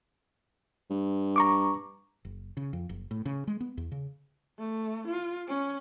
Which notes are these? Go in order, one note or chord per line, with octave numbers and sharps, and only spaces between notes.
G2
A#5 C#6 D6
F#1
C#3
F2
F#1
A2
C#3
G#3
B3
E2
C#3
A3
F4
C#4